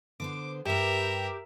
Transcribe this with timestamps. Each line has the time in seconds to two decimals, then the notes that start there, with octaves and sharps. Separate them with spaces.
0.20 D3 B3 C5 D6
0.65 G2 G4 A#4 B4 E5